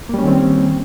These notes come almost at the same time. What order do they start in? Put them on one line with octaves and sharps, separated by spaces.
A#3 G3 C#4 D#3 C4